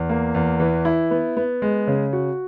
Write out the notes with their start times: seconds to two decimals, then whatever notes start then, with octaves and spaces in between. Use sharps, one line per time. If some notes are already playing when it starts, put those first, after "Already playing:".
Already playing: E2
0.09 A#3
0.34 E2
0.60 E3
0.85 E4
1.11 B3
1.37 B3
1.62 G#3
1.87 C#3
2.13 F#4